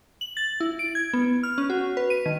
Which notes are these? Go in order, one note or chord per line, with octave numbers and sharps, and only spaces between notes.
F#7
A6
E4
D7
G#6
B3
F6
C#4
F#4
B4
D#7
D#3